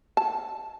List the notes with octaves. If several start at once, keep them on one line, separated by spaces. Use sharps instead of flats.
A5